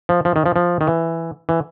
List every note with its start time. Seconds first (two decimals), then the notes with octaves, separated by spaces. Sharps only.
0.09 F3
0.25 F3
0.36 D#3
0.46 F3
0.56 F3
0.81 D#3
0.87 E3
1.49 E3